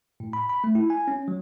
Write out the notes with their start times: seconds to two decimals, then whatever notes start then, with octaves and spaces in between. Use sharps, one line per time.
0.20 A2
0.33 B5
0.49 B5
0.64 A3
0.75 E4
0.90 G#5
1.08 C#4
1.28 F#3